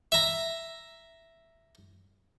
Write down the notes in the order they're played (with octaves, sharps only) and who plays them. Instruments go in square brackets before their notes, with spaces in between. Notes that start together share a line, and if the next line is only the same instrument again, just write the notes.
[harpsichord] E5 A#5